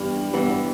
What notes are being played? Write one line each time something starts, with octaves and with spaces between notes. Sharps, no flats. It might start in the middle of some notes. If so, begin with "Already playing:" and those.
Already playing: G2 E3 G3 B3
G2 E3 B3